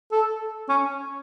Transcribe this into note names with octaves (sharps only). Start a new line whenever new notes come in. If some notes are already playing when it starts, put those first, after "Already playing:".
A4
C#4